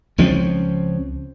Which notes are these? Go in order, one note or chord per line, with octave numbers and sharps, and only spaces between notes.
C#2 F3 C4 C#4